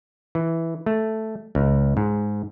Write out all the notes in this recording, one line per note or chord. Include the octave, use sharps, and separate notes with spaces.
E3
A3
C#2
G#2